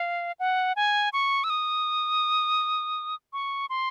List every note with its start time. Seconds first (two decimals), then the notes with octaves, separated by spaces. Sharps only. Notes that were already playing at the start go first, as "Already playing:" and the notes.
Already playing: F5
0.40 F#5
0.76 G#5
1.13 C#6
1.44 E6
1.50 D#6
3.33 C#6
3.70 C6